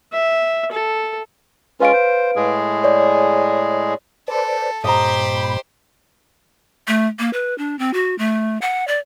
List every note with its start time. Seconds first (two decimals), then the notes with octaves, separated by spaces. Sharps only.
0.13 E5
0.72 A4
1.80 G#3 C#4 F4 B4 F5 D7
1.93 C5
2.36 A2 G#3 G#4
2.84 C#5 D5
4.28 A4 B4 C5 D5
4.84 G2 A#2 G4 C5 D#5 A#5 B5
6.88 A3
7.19 A#3
7.33 B4
7.58 D4
7.79 C4
7.94 F#4
8.19 A3
8.62 F#5
8.88 D5